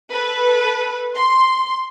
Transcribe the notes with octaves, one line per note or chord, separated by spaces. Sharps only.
A4 B4
C6